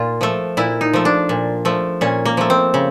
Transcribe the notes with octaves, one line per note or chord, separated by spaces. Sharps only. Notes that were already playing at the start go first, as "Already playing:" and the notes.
Already playing: A#2 F4
F3 A3
A#2 E4
D#4
F3 A3
D4
A#2
F3 A3
A#2 C#4
A#3
F3 A3
C4
C#3